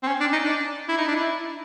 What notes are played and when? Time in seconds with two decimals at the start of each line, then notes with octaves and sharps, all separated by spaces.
0.03 C4
0.07 C#4
0.20 D4
0.32 D#4
0.44 D4
0.89 E4
0.98 D#4
1.08 D4
1.16 E4